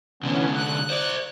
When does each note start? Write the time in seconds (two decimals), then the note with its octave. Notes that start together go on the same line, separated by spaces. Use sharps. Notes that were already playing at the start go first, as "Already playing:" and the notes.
0.23 C2 D3 E3 B3 C#4
0.55 F#6
0.90 C5 D5